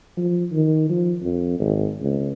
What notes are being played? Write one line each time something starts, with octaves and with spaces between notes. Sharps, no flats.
F3
D#3
F3
F2
G#1
C#2